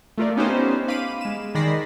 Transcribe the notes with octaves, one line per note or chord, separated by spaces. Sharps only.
A3 F4 A#4 D5
B3 C#4 D#4 G4 B4 C5
F5 B5 D6 D#7
G#3 E7
D#3 G#3 D5 B5 A#6 C7